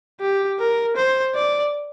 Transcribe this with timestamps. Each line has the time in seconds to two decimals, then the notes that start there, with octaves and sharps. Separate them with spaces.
0.21 G4
0.59 A#4
0.96 C5
1.35 D5